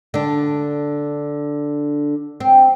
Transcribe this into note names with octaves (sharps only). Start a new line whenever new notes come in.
D3 D4
C4